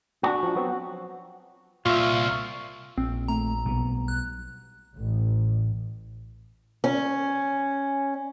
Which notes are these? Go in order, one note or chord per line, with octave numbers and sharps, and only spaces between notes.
D4 F#4
F3 D4
F#3 B3 C4
C2 A#2 F4 E5 C#6 F6
A#1 C4
A3 A#5
B1 G3 B3
F#6
A1
C#4